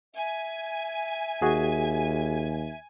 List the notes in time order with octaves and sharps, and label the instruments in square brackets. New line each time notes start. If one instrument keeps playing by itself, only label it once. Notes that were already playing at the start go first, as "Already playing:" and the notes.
[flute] E5 [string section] G#5
[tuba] D#2 [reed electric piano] F#4 G#4